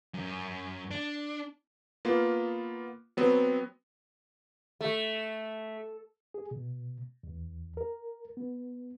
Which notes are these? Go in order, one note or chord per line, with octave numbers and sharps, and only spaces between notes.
F#2
D4
A#3 B3 F4
F#3 B3 C4
A3
G#4
B2
E2
A#4
B3